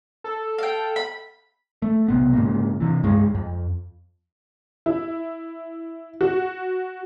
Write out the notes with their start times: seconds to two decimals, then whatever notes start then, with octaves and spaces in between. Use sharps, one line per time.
0.24 A4
0.58 F5 G5
0.96 B5
1.82 A3
2.08 B1 C3 B3
2.33 G#2 C#3 A#3
2.80 C3 E3
3.03 C#2 G2 G#3
3.35 F2
4.86 E4
6.21 F#4